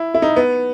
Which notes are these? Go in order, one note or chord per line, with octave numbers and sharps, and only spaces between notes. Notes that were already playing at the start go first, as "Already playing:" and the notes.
Already playing: E4
E4
D#4
B3